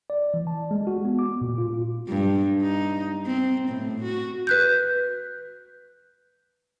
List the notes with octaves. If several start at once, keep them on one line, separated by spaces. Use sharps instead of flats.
D5
E3
A5
G#3
F#4
B3
D6
A#2
F4
G2
D#4
C4
A2
F#4
B4 F#6 G6